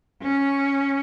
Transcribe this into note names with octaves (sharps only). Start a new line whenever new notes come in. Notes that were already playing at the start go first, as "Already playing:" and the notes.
C#4